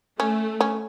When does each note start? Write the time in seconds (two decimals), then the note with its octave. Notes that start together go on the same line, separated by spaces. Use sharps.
0.19 A3 C#4
0.61 C#4